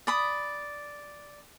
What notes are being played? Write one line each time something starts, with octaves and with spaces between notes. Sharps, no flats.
D5 B5 D#6